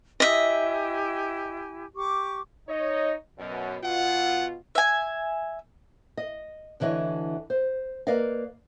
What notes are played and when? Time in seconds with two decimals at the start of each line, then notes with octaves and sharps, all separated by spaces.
0.20 E4 G4 D#5 E5 G#5
1.95 G4 C#6 D6
2.68 D#4 C#5 D#5
3.39 F#2 B2
3.83 B2 F4 F#5
4.75 E5 G#5
6.17 D#5
6.80 D2 D3 E3 C#5 D#5
7.50 C5
8.07 A#3 A#4 B4 D5 D#5 F5